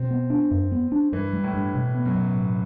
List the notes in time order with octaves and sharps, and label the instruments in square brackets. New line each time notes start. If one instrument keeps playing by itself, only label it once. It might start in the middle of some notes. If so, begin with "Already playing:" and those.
Already playing: [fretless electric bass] B2 [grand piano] C4
[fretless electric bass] B3
D4
F#2
B3
D4
[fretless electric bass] G2 [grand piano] E3
[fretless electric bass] G3
[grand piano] A2
[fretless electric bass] G2
B2
B3
[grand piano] F#2
[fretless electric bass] B2
A2